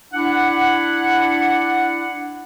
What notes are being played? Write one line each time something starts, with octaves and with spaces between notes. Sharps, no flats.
D4 E4 F#5